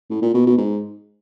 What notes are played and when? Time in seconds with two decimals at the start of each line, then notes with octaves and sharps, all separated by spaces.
0.10 A2
0.22 A#2
0.34 B2
0.46 B2
0.58 G#2